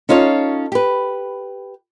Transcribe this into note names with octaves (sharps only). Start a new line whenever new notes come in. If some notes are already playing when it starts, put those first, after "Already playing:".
C#4 D#4 F4 A4 C#5
G4 B4